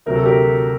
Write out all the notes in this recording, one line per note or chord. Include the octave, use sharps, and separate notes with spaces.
D2 C3 F#3 A#4
A4
G4 A#4